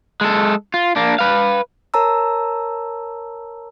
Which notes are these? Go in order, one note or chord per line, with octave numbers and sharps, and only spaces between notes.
G#3 A4
F4
A#3 D4
B4 F5
A#4 C#5 A5 A#5 E6